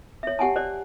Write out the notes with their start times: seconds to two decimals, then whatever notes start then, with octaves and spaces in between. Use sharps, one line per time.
0.23 C#5 E5
0.39 G4 F#5 G#5 A5
0.56 C5 D5